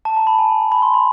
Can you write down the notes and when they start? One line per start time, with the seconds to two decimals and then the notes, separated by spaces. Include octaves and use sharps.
0.05 A5
0.17 A#5
0.27 B5
0.38 G#5
0.61 A#5
0.72 B5
0.82 C6
0.94 B5